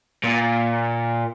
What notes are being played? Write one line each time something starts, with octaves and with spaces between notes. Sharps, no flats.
A#2